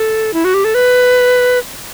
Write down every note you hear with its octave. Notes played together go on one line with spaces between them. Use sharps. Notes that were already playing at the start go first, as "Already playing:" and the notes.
Already playing: A4
E4
F#4
G4
A4
B4